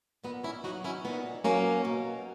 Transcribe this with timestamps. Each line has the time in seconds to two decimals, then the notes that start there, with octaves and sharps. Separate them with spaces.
0.24 A#2 B3 D#4
0.44 C#4 E4
0.64 F#3 D#4 F#4
0.84 C#4 E4
1.04 A#2 B3 D#4
1.44 F#3 A#3 C#4
1.85 B2